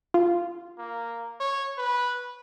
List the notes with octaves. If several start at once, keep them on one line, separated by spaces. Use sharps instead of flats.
F4
A#3
C#5
B4